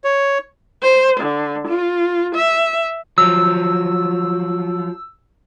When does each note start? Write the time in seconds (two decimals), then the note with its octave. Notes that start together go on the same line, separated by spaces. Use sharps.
0.04 C#5
0.83 C5
1.20 D3
1.67 F4
2.35 E5
3.18 F3 F#3 E6